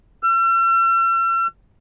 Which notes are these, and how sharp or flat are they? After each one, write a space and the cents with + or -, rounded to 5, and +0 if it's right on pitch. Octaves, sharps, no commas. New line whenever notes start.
E6 +45